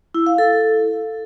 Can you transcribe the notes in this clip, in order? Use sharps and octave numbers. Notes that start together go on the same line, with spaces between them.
E4
F5
A4